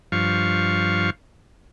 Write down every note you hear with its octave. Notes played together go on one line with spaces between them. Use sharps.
G2 F3 F5 C#6